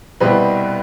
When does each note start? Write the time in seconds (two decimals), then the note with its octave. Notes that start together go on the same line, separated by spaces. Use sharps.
0.20 C2 B2 G3 C4 B4